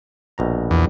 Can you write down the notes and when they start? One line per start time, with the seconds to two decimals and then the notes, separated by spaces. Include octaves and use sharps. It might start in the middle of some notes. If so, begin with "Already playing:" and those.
0.38 A#1 B2 A#5
0.71 E2